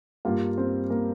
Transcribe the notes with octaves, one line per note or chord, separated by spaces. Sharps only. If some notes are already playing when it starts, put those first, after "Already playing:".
G2 G3 A#3 F4 F5
C4 C5
A#3 A#4